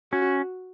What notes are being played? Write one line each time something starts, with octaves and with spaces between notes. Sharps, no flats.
C#4 F#4